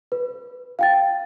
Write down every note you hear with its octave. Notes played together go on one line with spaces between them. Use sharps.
B4
F5 G5 A6